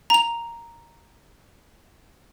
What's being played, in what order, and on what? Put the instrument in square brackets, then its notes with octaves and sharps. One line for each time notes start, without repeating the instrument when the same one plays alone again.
[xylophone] A#5 F7